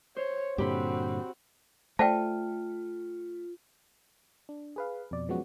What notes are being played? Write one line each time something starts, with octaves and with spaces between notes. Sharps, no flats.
C5 C#5
G2 A#2 D3 C4 F#4 G4 B5
A3 F4 C5 D5 G5 A5
D4
G#4 B4 F5
F2 B2 D5
F3 F#3 G#3 B3 C#4 F#4